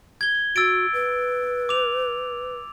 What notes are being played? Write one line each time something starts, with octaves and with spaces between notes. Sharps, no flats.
G#6 G7
F#4 E6 A6 D7
B4
D6 F7